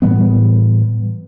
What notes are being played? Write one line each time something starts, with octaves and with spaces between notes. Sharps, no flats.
A2 E3 G3 B3